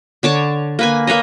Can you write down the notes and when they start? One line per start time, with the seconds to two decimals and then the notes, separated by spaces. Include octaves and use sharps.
0.23 D3 C#5 A5 D6
0.79 A#3 B4 G#5
1.07 A#3 B4 C#5 D#5